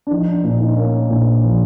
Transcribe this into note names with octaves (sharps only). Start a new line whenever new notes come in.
D4
F3 D#4
D4
A#2 D4
D#4
A#3 C#4
A#2 D4
F3